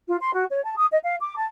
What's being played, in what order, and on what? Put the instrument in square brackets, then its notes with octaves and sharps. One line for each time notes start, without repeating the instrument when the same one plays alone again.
[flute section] F4
C6
F#4
C#5
A5
D#6
D#5
F5
D6
A5